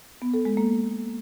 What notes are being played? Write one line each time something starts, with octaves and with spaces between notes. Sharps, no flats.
B3
A4
G#3
A#3